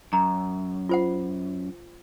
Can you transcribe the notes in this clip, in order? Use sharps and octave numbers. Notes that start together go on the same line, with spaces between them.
F#2 A#5
F4 C5 F#5